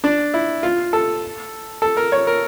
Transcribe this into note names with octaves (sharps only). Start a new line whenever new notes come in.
D4
E4
F4
A4
A4
A#4
C#5
A#4